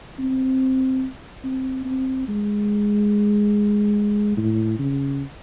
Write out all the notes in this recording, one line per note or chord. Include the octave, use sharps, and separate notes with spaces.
C4
C4
C4
G#3
A2
C#3